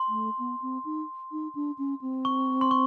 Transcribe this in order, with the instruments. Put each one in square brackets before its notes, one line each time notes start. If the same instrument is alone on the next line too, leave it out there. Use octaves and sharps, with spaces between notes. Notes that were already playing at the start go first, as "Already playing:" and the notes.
Already playing: [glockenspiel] C6
[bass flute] A3
B3
C4
D#4
D#4
D4
C#4
C4
[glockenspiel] C#6
C6
C#6